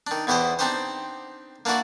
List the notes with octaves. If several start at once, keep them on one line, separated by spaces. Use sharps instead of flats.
D#3 D4
E2 B2 E4 G4 C5 D#5
C4 D4 D#4 G4 C5
A#3 D4 E4 F#4 D5